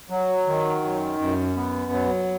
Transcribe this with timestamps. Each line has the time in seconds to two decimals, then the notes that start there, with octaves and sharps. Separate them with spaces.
0.10 F#3
0.47 D#3
0.83 F#2
1.19 F#2
1.56 B3
1.92 F#3